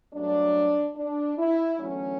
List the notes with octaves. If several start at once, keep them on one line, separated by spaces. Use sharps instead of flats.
G2 F#3 A3 D4
D4
E4
E2 D3 F#3 A3 C#4